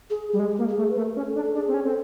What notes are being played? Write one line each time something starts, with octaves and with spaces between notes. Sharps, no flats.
G#4
G3 G#4
G#3 G4
A#3
G#4
A3
B4
A3 A#4
C#4
A4
D4
A4
D4 G#4
C4
C#4
C4 A4